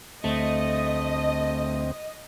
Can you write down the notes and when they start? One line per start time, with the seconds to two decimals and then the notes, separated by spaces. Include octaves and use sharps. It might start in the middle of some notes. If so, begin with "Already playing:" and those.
0.24 D2 A3 C4 D#5